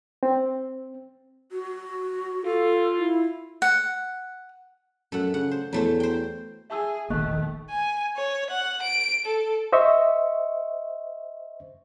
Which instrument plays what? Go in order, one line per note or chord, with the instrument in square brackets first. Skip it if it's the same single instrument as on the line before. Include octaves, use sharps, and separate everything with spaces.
[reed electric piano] C4
[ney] F#4
[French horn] F4 [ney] A4
[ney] E4
[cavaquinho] F#5
[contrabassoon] F#2 [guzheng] A3 A4 F#5
[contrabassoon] C#3 [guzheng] F#5
[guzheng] C5
[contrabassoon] E2 [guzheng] F#3 A3 C5
[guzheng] C5 G5
[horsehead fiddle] G#4 [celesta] E5 A5 E6
[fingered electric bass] E1 A#1 A#3 [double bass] D#3 [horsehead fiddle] A3 [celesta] D#5 C#6 F#6
[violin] G#5
C#5
F#5
D7
A4
[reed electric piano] C5 D#5 E5 C#6